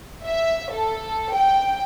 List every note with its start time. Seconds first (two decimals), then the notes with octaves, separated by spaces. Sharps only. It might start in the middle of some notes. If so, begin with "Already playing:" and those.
0.25 E5
0.73 A4
1.35 G5